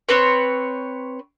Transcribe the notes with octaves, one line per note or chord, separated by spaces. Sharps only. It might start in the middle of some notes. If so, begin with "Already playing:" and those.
C4 B4 C#5